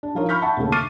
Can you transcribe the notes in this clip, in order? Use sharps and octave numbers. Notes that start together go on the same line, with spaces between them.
D4
F3 D#4 F4 A#4 C#5
B5 C#6 F6 G6 B6
E5 F#5 A5 B5 C#6
D#2 C#3 A3
C#6 D6 F6 A6 C7 D#7